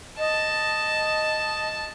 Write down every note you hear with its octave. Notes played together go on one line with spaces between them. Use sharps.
D#5 A5